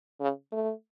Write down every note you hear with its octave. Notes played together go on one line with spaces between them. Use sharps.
C#3
A3